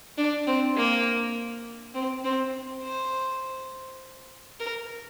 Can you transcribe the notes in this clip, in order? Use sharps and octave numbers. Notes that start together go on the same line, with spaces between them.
D4
C4
A#3
C4
C4
C5
A#4